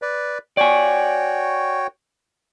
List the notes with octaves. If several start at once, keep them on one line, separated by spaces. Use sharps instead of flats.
B4 D5
F#4 C#5 D5 G5 G#5